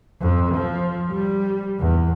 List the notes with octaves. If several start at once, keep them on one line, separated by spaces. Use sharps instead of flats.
F2
F3
G3
E2